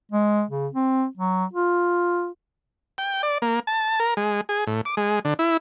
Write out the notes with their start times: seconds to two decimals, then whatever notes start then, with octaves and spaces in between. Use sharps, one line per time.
0.11 G#3
0.50 C#3
0.73 C4
1.17 F#3
1.53 F4
2.98 G5
3.23 D5
3.42 A#3
3.67 A5
4.00 A#4
4.17 G#3
4.49 G#4
4.67 A2
4.85 D6
4.97 G#3
5.25 D3
5.39 E4